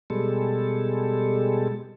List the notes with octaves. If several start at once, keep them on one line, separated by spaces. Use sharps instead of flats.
B2 G3 G#3 A4